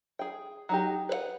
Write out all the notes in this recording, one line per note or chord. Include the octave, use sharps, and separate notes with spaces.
G#4 G5
F#3 D#4 G4
B4 C5 F#5